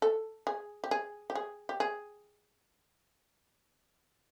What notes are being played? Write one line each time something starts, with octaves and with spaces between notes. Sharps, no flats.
A4
G#4
G4
G#4
G4
G#4
G4
G#4